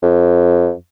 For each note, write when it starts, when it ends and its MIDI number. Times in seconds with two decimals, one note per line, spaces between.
0.03 0.73 41